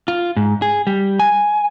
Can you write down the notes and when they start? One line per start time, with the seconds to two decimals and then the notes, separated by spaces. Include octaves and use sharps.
0.08 F4
0.37 G#2
0.62 G#4
0.87 G3
1.20 G#5